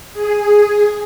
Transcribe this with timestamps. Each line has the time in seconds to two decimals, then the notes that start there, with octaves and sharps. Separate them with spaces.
0.13 G#4